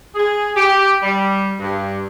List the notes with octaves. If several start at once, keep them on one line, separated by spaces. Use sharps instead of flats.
G#4
G4
G3
G2